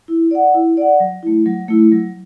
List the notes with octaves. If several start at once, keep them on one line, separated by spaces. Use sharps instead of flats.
E4
D5 F#5
E4
D5 F#5
F#3
A3 E4
F#3
A3 E4
F#3